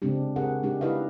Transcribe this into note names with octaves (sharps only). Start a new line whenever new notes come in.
C#3 G#3 C4 D4 G4
C4 G4 G#4 A#4 F#5
G#3 D4 D#4 G4
D#4 E4 G4 B4 D#5 F5